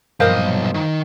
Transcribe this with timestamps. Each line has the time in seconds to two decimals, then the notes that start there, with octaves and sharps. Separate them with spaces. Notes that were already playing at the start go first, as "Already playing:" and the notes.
0.20 B1 G2 A#2 F3 A#4 C5 D#5 F5
0.74 D#3